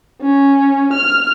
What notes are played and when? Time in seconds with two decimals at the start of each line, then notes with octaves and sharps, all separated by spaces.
0.22 C#4
0.93 F6